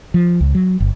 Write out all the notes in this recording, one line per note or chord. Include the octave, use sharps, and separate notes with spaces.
F3
C#2
F#3
G1